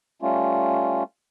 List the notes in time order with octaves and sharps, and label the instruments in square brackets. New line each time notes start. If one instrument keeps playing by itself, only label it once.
[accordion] G3 A3 C#4 F4